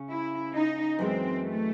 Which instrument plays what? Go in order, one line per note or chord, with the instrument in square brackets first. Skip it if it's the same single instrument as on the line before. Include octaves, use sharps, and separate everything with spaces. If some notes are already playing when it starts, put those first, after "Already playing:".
Already playing: [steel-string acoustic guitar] C#3 C#4
[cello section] E4
D#4
[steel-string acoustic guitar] F#2 E3 G#3 [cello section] C4
[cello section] A3